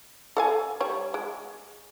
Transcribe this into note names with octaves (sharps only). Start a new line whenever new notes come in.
A4 F5 G#5
G3 C#5
G#3